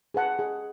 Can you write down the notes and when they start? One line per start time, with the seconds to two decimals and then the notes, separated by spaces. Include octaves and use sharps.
0.14 G#4 B4 F#5 A5
0.39 G#4